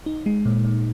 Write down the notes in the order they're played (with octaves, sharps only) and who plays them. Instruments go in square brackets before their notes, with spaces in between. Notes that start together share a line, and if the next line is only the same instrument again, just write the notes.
[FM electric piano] D#4
G#3
A#2
A#2